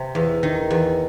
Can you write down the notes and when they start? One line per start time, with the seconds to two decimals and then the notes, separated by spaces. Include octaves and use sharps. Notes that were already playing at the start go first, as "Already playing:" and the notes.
Already playing: C3
0.15 E2
0.43 D#3
0.70 E2